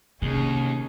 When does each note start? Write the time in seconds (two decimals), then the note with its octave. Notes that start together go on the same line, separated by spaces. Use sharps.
0.22 D#2 C3 C#4 D#4 G#4